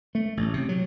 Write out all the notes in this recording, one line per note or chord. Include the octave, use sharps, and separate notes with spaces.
A3
A1
C3
F#3